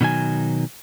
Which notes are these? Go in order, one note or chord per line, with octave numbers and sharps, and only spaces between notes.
B2 D#3 F#3 G#5